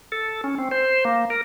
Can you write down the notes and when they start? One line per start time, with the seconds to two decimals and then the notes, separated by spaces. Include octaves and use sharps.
0.12 A4
0.44 C#4
0.58 C4
0.71 C5
1.05 A#3
1.30 A#4